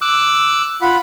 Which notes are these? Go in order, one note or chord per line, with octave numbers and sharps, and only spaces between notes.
D6 E6 F#6
F4 F#5 B5